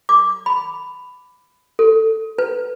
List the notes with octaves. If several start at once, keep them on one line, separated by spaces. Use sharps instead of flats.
D6
B5
A4
B4